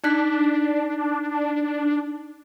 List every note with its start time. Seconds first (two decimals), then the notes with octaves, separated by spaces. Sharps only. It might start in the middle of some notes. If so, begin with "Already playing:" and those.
0.04 D4 D#4 F#6 B6